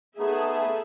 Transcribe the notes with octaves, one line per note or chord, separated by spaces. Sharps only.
A3 B3 D#4 G#4 A4 E5